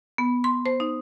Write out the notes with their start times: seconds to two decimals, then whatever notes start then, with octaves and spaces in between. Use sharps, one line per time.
0.18 B3
0.44 C6
0.66 C5
0.80 D#4